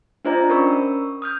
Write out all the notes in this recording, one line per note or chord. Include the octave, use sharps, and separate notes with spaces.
D4 F4 C5 D5 D#5 A#5
C#4 A#4 B5 C#6 E6
D#6 F6 G6